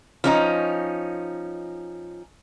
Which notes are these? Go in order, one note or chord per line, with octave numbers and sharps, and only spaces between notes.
F3 C#4 D#4